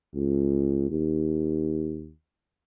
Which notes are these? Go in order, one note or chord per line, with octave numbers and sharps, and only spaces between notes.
C#2
D#2